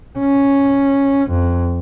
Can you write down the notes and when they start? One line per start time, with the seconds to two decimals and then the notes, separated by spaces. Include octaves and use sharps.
0.19 C#4
1.30 F2